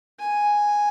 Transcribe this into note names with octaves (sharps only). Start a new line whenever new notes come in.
G#5